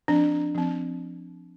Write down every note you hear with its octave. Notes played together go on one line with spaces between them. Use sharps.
F3 C4 D4
F3 C4